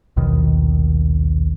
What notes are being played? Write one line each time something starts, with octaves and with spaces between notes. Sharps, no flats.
A#1 D#2 B2 D#3